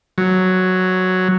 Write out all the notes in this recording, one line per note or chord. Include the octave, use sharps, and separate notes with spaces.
F#3